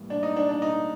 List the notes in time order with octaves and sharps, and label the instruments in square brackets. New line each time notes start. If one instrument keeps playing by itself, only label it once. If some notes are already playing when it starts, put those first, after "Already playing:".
Already playing: [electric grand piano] A2 E3 G3 A#3
[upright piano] D4
D#4
D4
D4
D#4